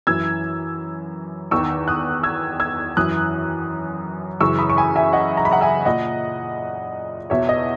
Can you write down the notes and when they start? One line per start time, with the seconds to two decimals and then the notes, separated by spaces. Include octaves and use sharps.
0.07 F#2 E3 E6 G#6
1.51 E2 D#3 C#6 E6
1.88 D#6 F#6
2.23 E6 G#6
2.60 E6 G#6
2.97 F#2 E3 D#6 F#6
4.40 F#2 C#3 E3 C#6 E6
4.59 B5 D#6
4.70 C#6
4.77 G#5 B5
4.96 E5 G#5
5.13 D#5 F#5
5.37 A#5
5.45 B5
5.51 F#5 A#5
5.61 E5 G#5
5.85 A#2 D#5 F#5
7.30 E2 B2 C#5 E5
7.49 D#5